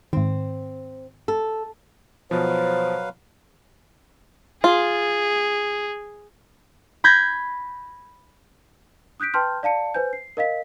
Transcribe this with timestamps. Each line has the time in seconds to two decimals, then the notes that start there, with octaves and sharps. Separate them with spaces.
0.13 G#2 D#3 C4
1.28 A4
2.31 B2 F3 F#3 B4 C5 F5
4.64 F4 G#4
7.04 B5 G6 G#6 A#6
9.20 D#6 F#6 G6 B6 D7
9.34 B4 G5 A5 C6 F6 G6
9.63 D5 F5 A5 C#7
9.94 B4 C5 G#5 G6
10.13 C7
10.37 A#4 D#5 F5 B6